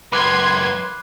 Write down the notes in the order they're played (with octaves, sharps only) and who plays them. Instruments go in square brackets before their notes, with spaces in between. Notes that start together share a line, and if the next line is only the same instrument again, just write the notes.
[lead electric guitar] C#2 F#2 [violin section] B4 C6 G#6 [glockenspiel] B5 D6 F#6